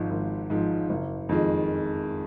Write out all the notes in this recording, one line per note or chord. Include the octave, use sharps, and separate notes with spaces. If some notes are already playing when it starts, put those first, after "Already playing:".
Already playing: G#1 G#2 F3
G#1
G#2 F3
F#1
F2 D#3 G#3